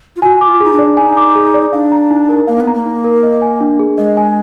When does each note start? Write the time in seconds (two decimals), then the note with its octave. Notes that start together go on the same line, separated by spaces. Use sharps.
0.16 F4
0.22 F#4 G#5
0.41 D6
0.47 F4
0.60 D#4 G#4
0.73 D4
0.79 D5
0.97 D#4 G#5
1.17 D6
1.35 G#4
1.54 D5
1.73 D4 F5
1.92 A#5
2.11 D#4
2.29 A#4
2.47 A#3 F5
2.60 B3
2.67 A#5
2.74 A#3
2.86 D#4
3.04 A#4
3.23 D#5
3.42 G#5
3.61 D4
3.79 G#4
3.98 G#3 D#5
4.17 G#5